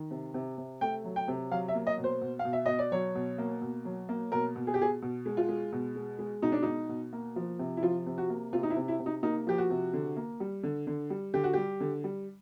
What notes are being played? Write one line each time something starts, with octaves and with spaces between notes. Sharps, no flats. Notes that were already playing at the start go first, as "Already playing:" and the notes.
Already playing: D#3
C3
C3
C3
A3 G5
F#3
G5
C3
F#3 F5
E5
A#3
D#5
B2
C5
B2
F5
B2
E5
B2 D#5
D5
F#3 C#5
B2
A#3
B2
F#3
A#3
B2 A#4
B2
G#4
G4
B2 G#4
B2
G#3
F4
G#3
B2
G#3
G#3
B2 D#4
D4
B2 D#4
B2
A#3
F3
C3
E4
F3 F4
C3
F#4
A#3
C3 F4
D#4
E4
C3
E4
C3
D#4
A#3 D#4
F3 G4
F#4
C3
D3
A#3
G3
D3
D3
G3
D3 G4
F#4
G3 G4
D3
G3